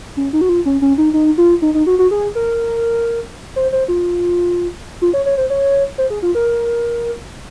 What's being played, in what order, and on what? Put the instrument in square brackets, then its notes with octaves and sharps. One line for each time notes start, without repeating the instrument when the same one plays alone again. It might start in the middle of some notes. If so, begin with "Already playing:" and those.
[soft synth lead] C#4
D#4
F#4
F4
C#4
C#4
D#4
D#4
F4
D#4
D#4
F#4
F#4
G#4
A#4
C5
C5
F4
F4
C#5
C#5
C5
C#5
C5
G#4
F4
A#4